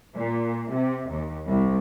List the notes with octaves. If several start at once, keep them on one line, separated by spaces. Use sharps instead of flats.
A#2
C3
D#2
C2